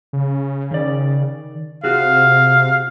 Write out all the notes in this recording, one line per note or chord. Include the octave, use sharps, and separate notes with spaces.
C#3
D#3 D5
C3 F4 F#4 G#4 F5